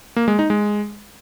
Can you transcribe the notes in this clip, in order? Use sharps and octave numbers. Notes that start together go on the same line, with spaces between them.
A#3
G#3
D#4
G#3